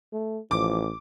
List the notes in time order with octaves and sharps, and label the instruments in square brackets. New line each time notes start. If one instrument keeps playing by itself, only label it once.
[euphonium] A3
[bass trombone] A1 [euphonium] F3 [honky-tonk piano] D6